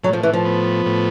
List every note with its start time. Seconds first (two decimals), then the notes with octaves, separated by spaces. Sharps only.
0.03 A2 F#3
0.13 F3
0.23 E3
0.33 F3
0.45 B3
0.86 A2